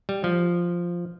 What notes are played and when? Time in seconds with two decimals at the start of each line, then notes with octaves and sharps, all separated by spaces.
0.09 G3
0.24 F3